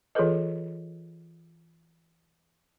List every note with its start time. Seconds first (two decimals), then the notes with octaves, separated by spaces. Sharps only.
0.15 E3 F4 G#4 A4 B4 D#5